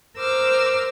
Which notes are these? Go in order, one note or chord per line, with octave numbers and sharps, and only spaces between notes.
A#4 C5 D6 E6 F6